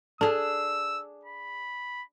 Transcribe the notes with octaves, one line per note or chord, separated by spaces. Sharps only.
D4 G#4 A4 A5 E6
B5